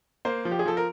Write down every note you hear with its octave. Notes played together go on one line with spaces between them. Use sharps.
A#3 C5
F3
G4
G#4
F3 A4
A#4